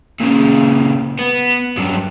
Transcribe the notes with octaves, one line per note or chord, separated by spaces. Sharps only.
A#2 C#3
B3
G2 F#3